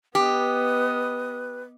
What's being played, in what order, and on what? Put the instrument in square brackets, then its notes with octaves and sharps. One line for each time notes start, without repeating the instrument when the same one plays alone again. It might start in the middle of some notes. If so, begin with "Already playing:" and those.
[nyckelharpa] B3 D#5 [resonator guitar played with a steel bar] G4 [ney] B4